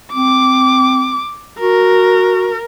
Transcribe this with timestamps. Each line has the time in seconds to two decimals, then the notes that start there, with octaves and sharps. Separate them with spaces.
0.14 C4 D6
1.60 F#4 A#4